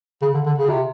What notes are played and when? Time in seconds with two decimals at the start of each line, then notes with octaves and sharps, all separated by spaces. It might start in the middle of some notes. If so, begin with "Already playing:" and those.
0.22 C#3
0.34 D3
0.46 D3
0.58 C#3
0.69 C3